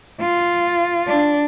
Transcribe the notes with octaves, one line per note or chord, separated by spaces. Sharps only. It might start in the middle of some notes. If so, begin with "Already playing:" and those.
F4
D4